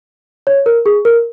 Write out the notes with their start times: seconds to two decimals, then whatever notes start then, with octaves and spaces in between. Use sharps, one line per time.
0.47 C#5
0.66 A#4
0.86 G#4
1.05 A#4